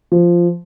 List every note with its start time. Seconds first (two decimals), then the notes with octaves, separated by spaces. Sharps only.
0.12 F3